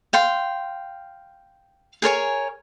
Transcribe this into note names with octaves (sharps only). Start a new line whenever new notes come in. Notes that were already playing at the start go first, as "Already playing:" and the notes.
F5 G5 C6
G#4 A#4 C#5 G#5